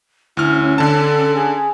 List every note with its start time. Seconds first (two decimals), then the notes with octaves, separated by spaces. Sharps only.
0.37 D2 C#4 E4 G#5 F6
0.78 D3 A4 A5
1.35 G#4